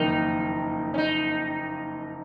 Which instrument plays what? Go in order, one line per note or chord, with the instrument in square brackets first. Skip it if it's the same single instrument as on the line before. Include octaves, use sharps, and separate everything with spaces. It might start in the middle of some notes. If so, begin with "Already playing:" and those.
Already playing: [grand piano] F#1 F2 D#3 A#3 [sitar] D#4
[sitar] C#4
D#4